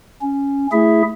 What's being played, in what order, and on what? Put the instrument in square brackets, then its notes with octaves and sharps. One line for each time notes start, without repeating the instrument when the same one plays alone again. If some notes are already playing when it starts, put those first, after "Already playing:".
[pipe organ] C#4
A3 E4 G#4 E5